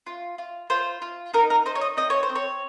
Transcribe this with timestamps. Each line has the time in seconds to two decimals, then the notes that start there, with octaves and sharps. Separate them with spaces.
0.07 F4
0.38 F4
0.70 F4 C5
1.02 F4
1.34 D#4 A#4
1.50 A#4
1.65 D#4 C5
1.75 C#5
1.81 D#5
1.97 C4 D#5
2.10 C#5
2.23 C5
2.29 C4
2.36 C#5